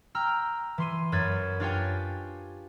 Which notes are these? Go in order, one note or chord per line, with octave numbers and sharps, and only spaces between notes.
G5 A#5 E6 F6
E3 C6 D#7
F#2 B4 G#6 A6
D4 F4 G4 C#5 G5 G#5